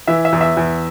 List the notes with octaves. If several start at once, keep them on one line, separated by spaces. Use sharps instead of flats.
E3 E5
E5
E2
E5
E2